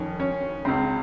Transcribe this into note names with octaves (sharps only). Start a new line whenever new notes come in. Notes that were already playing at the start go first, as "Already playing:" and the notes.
Already playing: F2 D#3 C#4
C#4
C#2 C#3 C4